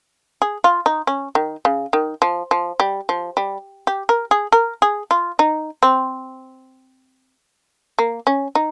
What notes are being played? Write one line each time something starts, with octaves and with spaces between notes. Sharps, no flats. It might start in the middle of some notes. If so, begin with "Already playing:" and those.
G#4
F4
D#4
C#4
D#3
C#3
D#3
F3
F3
G3
F3
G3
G4
A#4
G#4
A#4
G#4
F4
D#4
C4
A#3
C#4
D#4